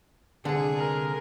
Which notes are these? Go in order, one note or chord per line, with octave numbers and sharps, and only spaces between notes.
C2 D3 G#4
A#4